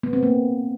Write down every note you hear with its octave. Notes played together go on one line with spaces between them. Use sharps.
B3
C4
A#3